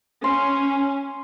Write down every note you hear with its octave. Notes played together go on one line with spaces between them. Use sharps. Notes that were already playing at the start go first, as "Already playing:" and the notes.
C#4 C6